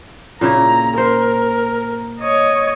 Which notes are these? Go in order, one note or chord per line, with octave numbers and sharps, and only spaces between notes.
A#2 C#3 E4 A#5
A#4 C5
C#5 D#5